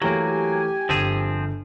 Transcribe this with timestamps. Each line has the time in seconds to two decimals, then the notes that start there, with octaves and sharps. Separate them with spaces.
0.02 E3 F#3 A3 A#3 G4 C#5 G#5
0.89 G1 F3 C4 G#4